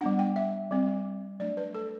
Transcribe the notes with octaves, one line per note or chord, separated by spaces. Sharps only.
G3 B3 D4 F#5
G5
E5
G3 C4
F#3 A3 D4 D5
B4
A4